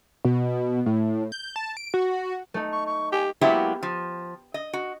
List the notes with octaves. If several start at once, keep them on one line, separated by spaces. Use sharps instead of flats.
B2
A2
G6
A5
D7
F#4
A3 D#4
C#6
C#6
G4 G#5
F#3 G#3 A#3 B3 E4 G4
F3
D#5
F#4